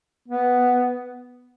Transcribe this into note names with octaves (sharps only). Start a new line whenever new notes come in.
B3